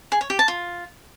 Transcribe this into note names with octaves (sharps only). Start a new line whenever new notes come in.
G#4
C#5
G4
A5
F4